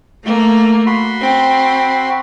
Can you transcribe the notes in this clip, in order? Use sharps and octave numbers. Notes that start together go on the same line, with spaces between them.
A3 A#3
F#4 B5 C6
C4